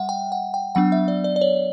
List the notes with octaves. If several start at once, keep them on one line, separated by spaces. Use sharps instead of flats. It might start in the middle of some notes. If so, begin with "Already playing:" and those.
Already playing: G3 E5 F#5
G5
F#5
G5
F#3 B3 D4 F#5
E5
D5
D5
D5
C#5